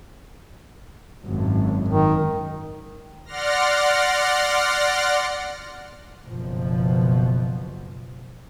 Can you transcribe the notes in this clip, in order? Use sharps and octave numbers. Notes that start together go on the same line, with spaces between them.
G#1 F#2
D#3
D5 F#5 C6 F6 A#6
F#1 B2 F3